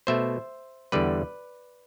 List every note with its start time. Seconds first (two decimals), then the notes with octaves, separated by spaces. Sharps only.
0.07 B2 A3 C5 E5
0.92 E2 D3 G3 B3 B4 D5